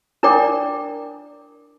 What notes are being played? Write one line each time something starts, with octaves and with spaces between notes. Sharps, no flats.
D4 E4 A#4 D5 G5 D6